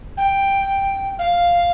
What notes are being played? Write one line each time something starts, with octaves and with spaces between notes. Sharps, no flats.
G5
F5